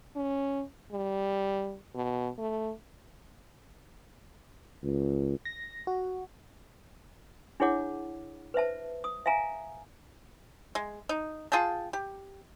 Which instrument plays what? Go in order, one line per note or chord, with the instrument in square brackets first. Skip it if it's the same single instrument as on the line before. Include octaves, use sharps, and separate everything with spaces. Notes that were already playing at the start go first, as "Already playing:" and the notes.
[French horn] C#4
G3
B2
A3
[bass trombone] C#2
[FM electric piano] A#6
F#4
[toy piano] D4 E4 G#4 C#5 F#5 D6
B4 C5 E5 A5
D#6
E5 F5 G#5 A#5
[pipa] G#3
D#4
F4 G#4 G5 A5
G4